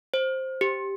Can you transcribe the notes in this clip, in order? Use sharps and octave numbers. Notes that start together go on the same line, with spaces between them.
C5
G4